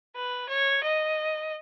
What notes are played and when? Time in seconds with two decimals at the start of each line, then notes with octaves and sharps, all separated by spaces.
0.16 B4
0.49 C#5
0.83 D#5